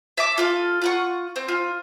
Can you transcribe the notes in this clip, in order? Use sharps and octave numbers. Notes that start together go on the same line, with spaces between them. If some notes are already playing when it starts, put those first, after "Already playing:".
E5 A5 D6
F4 A4 F5
F4 F#5 C#6
C4
F4